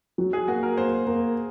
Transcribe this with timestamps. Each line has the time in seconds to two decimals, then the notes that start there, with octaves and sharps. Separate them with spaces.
0.18 F#3
0.33 G#4
0.48 A#3 F#4
0.63 A#4
0.77 A#3 C5
1.07 A#3